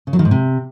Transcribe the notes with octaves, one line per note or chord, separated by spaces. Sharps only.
C#3
F#3
D#3
G#2
C3